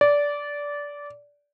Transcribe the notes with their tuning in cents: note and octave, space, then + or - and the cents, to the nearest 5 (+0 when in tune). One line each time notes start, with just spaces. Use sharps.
D5 -15